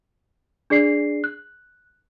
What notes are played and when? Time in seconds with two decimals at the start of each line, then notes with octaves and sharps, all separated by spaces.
0.70 D4 G#4 D5 C7
1.24 F#6